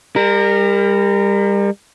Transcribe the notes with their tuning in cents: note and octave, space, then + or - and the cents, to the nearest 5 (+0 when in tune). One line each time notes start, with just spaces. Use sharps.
G3 +35 A#4 -15